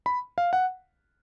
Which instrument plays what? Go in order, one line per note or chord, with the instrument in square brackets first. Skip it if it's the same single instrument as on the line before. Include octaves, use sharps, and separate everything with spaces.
[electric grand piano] B5
F5
F#5